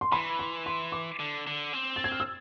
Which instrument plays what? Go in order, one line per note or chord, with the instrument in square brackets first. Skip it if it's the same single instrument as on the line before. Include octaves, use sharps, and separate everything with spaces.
[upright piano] C6
[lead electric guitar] E3 [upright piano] B5
[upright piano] C6
C6
D6
[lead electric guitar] D3
D3
C4
[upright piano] A6
G#6
F6
E6